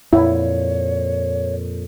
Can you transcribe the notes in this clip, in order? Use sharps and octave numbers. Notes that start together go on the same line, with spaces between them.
F2 A#2 E4 C#5